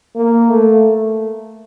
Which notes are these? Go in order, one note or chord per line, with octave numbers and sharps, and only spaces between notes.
A#3
A3